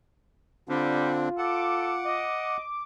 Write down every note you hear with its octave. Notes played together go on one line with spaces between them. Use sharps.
D3 G3 C4 D4 F4
A4 F#5 D6
D#5